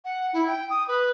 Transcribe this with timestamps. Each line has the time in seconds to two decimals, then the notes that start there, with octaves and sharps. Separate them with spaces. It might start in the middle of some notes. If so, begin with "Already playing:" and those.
0.05 F#5
0.33 E4
0.47 G5
0.70 D#6
0.88 B4